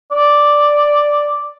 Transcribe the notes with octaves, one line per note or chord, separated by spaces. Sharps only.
D5